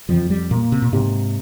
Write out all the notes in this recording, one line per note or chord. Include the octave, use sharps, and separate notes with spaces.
F2 F3
G3
A#2 A#3
C3
A#2
G#2 C3